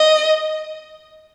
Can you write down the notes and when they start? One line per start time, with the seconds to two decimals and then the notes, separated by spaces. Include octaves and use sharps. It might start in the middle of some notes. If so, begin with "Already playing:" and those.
Already playing: D#5